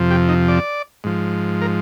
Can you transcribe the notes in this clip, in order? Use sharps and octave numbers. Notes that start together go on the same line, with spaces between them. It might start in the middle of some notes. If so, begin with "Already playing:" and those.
Already playing: F2 C3 F3
G4
D#4
D5
G#2 F3
A#4